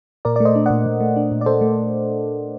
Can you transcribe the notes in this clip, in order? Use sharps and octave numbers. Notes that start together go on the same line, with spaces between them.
A#2 A#4 D5
D5
A3
C5 D#5
D4
A#2 D5 F#5
A#2
A3
D4
A#2
D5
A#2 A4 C5
A3